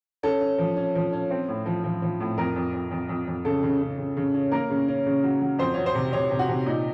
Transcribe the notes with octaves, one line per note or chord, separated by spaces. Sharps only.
C#4 A4
C#4
F3
C#4
F3
C#4
C4
A2
F3
F3
F3
A2
F2 A#4
F2
F2
F2
F2
F2
C#3 A4
C#3
C#3
C#3
C#3
C#4
A#3 A#4
C#3
C#4
C#3
F#3
F#3
F2 C5
F#3 C#5
C5
C3
C3 C#5
C3
F#4
C3
A#2 D#4